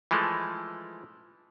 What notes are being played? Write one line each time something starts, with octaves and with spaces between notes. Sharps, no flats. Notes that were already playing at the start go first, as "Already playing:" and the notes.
E3 F3 G#3 A3